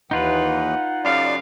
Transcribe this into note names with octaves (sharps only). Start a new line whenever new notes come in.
D#2 E3 D#4 F4 B4 F#5
F#2 C#3 D5 F5